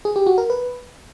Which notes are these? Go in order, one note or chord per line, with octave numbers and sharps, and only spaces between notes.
G#4
G4
F#4
A#4
B4